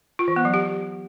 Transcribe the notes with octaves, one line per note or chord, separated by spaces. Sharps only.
F4
E3
B3
F#3
G4